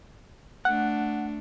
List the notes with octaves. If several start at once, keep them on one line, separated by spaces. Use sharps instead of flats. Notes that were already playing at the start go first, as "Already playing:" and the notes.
A3 D4 F#5